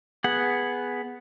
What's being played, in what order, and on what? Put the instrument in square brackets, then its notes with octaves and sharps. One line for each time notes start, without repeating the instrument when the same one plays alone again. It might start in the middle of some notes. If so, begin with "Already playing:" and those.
[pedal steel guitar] B3 G#4 F#5